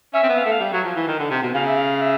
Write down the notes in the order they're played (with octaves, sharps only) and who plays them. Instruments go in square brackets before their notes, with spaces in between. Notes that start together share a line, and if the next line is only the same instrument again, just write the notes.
[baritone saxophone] C#4 [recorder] E5
[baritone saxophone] C4
B3
[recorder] F5
[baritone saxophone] A3 [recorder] E5
[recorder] F5
[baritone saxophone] G3
F#3
F3
E3
D#3
D3
C3
B2
[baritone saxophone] C#3 [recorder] F5
[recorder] E5
F5
E5